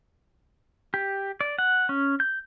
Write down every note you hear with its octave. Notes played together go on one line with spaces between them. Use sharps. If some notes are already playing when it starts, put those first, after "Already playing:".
G4
D5
F#5
C#4
G6